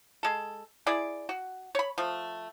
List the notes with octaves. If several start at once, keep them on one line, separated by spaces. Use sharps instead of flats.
G#3 A4
E4 G#4 D5
F#4
C#5 B5
F3 A3